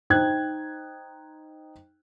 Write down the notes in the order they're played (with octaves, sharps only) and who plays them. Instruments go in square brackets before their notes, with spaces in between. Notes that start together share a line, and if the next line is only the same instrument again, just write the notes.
[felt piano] D#4 C5 G5 F#6 G#6